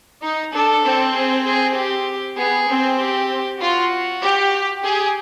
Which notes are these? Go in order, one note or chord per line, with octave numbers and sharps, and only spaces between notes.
D#4
D4 A4
C4
G#4
G#4
G4
B3 G#4
C4
G4
F4 F#4
G4
G4 G#4